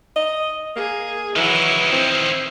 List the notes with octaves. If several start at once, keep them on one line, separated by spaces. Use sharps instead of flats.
D#5
A#3 G#4
D#3 E3 F#3 E4
C4 C5